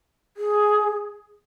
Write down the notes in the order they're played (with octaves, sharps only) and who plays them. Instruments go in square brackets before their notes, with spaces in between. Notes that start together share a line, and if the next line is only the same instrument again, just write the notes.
[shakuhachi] G#4